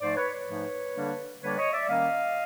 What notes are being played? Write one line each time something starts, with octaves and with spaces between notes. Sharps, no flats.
G#2 F3 A3 C5 D5
B4 C#5
B4 C#5
G#2 F3 A3
D3 G3 A#3 D4
D3 G3 A#3 D4 B4 C#5
C#5 D#5
D5 E5
D#3 G3 A#3 C#4 D#5 F5